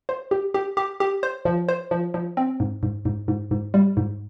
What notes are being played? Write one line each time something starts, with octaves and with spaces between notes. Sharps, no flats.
C5
G4
G4
G4
G4
C5
F3
C5
F3
F3
C4
G#2
G#2
G#2
G#2
G#2
G3
G#2